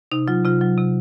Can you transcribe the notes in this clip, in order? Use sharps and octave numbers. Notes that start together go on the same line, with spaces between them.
C3 D#4
F#3 F4
C3 F4
F#3
C3